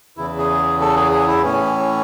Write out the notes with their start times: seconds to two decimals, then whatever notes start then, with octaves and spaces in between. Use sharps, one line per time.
0.17 E2 C#3 E3 E4
0.38 G#4
0.81 A4
0.97 G#4
1.11 G#4
1.28 E4
1.43 A2 E3 C#4